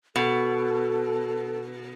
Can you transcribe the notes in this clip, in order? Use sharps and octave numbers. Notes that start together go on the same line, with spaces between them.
B2 A4